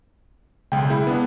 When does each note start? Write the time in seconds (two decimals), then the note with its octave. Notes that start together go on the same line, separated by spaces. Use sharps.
0.72 B1 C#3 G#3 G5
0.90 E4 G#4 B5
1.07 B3 D4